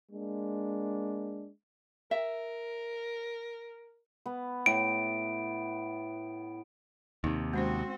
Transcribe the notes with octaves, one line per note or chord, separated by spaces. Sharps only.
G#3 A#3 D4
A#4 E5
B3
A2 D7
D#2 C3 D#4
G#3 C4 C#4 F#4 C5